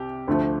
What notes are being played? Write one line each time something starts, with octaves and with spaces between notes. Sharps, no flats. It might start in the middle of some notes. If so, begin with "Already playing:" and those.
Already playing: C2 C3 G4
D2 D3 F3 A3